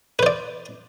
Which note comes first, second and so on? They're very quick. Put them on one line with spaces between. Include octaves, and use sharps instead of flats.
B4 C5 D5